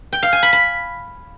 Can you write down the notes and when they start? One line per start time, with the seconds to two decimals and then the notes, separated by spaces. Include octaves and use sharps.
0.13 G5
0.23 F5
0.33 G#5
0.43 B5
0.53 B5